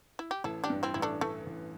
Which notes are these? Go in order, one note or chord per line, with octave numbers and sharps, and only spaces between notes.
E4
G4
A1 E4 A4
D4 G4
G2
C4 E4
A1 E4
A3 D4
E3 A3
A1